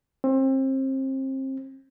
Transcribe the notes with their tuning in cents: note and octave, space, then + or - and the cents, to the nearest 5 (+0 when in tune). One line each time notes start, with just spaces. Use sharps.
C4 +30